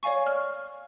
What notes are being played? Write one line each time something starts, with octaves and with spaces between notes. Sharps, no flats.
C#5 D5 F5 G#5 C#6
F6